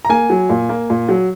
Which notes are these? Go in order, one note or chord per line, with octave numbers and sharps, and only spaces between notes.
A#5
A#3 G#5
F#3
A#2
A#3
A#2
F#3